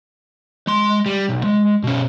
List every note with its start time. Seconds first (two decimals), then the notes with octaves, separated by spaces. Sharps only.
0.67 G#3 C6
1.06 G3
1.29 B1
1.44 G#3
1.84 B2 C#4